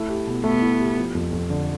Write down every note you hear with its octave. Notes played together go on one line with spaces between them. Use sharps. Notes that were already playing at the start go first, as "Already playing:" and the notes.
Already playing: A3 E4
G4
B2
A3 B3
E4
G4
F3
F2
F2
D3